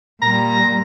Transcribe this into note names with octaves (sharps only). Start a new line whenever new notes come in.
A#2 G3 A#5